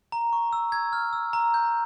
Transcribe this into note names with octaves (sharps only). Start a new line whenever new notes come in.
A#5
C#6
E6
G#6
F6
E6
A#5
G6